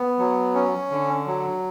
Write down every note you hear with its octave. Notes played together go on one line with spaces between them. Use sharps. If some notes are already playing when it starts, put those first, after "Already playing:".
Already playing: B3
F#3
C#4
D3
F#3